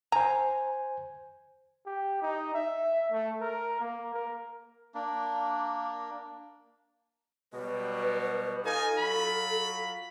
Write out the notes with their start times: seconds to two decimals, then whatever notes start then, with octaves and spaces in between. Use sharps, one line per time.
0.12 C5 G#5 A#5
1.86 G4
2.22 D#4
2.54 E5
3.11 A3
3.41 A#4
3.80 A#3
4.14 A#4
4.94 A#3 D4
7.53 B2 F#3 G3 B4
8.64 D#4 F4 A4 G#5
8.99 F#3 F4 B5